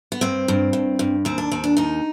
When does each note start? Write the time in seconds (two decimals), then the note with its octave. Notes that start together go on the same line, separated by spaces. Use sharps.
0.12 B3
0.21 G2 C4
0.48 G2
0.73 G2
0.99 G2
1.25 D#2 C4
1.38 D4
1.51 D#2 C4
1.64 D4
1.77 D#2 D#4